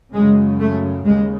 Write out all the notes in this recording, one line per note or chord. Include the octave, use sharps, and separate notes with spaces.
F#2 C#3 G#3
A3
D#2 C#3 G#3